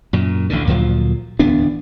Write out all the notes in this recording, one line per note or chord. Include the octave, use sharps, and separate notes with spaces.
F#2 A#2
A1 D2 D3
D2 A#2 F3 F#3
D1 E2 B3 D4